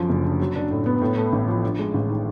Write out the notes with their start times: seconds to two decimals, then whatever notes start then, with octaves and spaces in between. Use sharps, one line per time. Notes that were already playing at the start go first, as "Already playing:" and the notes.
Already playing: F#2 D3 F3
0.09 F#1
0.24 D3
0.40 F#3
0.55 D4
0.71 A2
0.86 B3
1.01 A2
1.17 A3
1.33 A1
1.48 F3
1.63 G2
1.79 G#3
1.94 A1
2.10 D#3